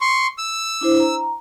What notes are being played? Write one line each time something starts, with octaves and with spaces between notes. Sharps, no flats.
C6 C#6
E6
D4 E4 C5
A#5